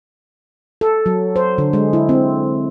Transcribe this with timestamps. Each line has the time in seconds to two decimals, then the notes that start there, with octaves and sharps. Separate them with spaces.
0.81 A4
1.06 F#3
1.36 C5
1.58 D3
1.73 G#3
1.93 E4
2.09 C4